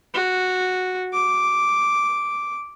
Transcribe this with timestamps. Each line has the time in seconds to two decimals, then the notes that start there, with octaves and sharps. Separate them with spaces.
0.14 F#4
1.13 D6